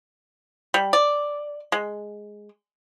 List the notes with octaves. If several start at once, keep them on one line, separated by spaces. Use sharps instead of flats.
G3
D5
G#3